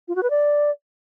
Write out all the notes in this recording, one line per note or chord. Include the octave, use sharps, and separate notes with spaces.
F4
F#4
B4
D5